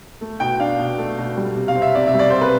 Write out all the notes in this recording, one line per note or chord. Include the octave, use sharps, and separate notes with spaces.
A3
B2 G5
D4 F5
B2
A3
B2
G3
C3
F5
C4
E5
C3 D5
E5
G3
D5
C3 C5
B4